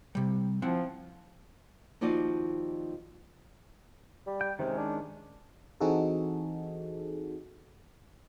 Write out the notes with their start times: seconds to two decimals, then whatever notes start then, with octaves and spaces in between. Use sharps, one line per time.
0.15 C3 G3
0.62 F3 C4 E4 F#5
2.01 D#2 F3 D#4 F#4 D5 F5
4.27 G3
4.41 G5
4.59 C3 D#3 G#3 C#4
4.78 D4
5.80 E3 C4 D#4 F#4 G#4 A4